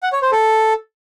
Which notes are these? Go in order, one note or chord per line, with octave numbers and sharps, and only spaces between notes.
F#5
C#5
C5
A4